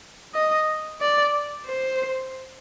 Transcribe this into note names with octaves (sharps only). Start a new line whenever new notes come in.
D#5
D5
C5